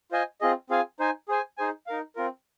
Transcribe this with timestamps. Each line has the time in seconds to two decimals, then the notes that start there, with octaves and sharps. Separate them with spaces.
0.11 F4 C5 D#5 G#5
0.41 C4 F4 G#4 D#5
0.70 C4 F4 G#4 F5 G#5
1.00 D#4 C5 G#5
1.28 G#4 C5 G#5
1.58 D#4 G#4 C5 G#5
1.86 D#4 A#4 F5
2.16 C4 F4 A#4